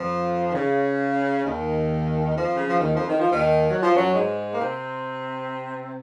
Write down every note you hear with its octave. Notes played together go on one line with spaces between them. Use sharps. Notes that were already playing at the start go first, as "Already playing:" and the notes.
Already playing: F2 F3
D#3
C#3
D#2 D#3
F2 F3
C#3
F3
D#2 D#3
F2 F3
D#3
F3
D#2 D#3
F#3
F3
F#2 F#3
G#2 G#3
A#3
C3 C4